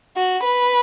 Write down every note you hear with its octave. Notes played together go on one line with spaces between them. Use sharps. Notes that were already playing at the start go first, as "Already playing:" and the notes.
F#4
B4